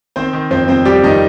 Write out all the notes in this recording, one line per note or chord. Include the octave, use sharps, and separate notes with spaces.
D#3 C4 C5
D#3
F2 C4 C5
F2 C4 C5
F2 G3 G4
F2 D#3 D#4